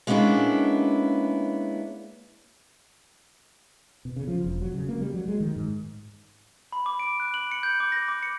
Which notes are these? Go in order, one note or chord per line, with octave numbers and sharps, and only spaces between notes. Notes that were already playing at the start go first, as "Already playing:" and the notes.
G#3 A#3 B3 C#4 D4 E4
B2
C#3
F3
E1
F#3
C#3
A#3
G3
F#3
G#3
D#3
G#2
B5
D6
D7
F#6
F#7
C#7
G6
D6
A#6
D6
C#7